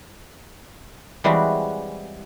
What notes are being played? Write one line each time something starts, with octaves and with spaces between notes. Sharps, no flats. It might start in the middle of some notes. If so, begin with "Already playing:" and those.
E3 G3 G#3 C4 F#4 B4